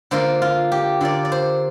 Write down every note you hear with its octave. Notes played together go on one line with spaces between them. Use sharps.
D3 A#3 F4 C5
F4
G4
D3 A#3 F4 D5
D5
C5